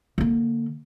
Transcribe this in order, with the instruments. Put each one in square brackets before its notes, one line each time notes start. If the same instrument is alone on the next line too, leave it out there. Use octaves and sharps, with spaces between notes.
[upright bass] D3 A#3